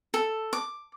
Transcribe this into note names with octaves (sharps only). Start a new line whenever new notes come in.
A4
D6